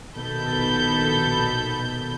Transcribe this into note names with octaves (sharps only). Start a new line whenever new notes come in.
A#1 B2 D#3 A4 B5 G6